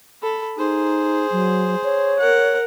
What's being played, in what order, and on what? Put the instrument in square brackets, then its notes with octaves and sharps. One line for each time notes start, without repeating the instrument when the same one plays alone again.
[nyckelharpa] A4 B5
[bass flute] D#4 [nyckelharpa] G#4 C5
[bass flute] F#3
C#5
[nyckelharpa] A#4 F#5